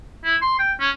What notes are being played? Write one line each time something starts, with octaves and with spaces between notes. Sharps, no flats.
E4
C6
G5
C#4